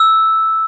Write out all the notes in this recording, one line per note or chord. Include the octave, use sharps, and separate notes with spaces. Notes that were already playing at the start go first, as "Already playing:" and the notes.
Already playing: E6